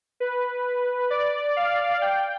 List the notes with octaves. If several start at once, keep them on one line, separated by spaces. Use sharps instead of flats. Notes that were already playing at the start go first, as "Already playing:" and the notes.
B4
D5
F5
G5